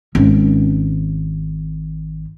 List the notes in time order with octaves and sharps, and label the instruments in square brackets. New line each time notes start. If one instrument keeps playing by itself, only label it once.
[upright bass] G#1 C#4